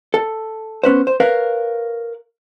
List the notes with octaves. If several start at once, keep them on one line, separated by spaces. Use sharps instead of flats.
A4
B3 C#4 B4 C5
C5
A#4 B4 C#5 F5